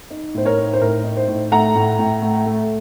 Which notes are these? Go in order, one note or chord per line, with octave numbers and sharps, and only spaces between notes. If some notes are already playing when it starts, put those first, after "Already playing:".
D#4
A2 C5
A#4 C#5
D#4
C5
A2 A#4
D#4
C5
A2
A3 F#5 A#5
A2
A2
A3
A3